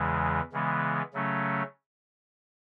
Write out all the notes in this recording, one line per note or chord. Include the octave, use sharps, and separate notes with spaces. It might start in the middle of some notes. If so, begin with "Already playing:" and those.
Already playing: E2 C#3 E3 G#3
C#3 E3 G#3 B3
C#3 F#3 A3 C#4